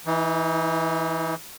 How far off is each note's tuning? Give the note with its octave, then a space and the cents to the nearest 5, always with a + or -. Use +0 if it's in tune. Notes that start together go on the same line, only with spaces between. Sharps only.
E3 -5 D#4 +35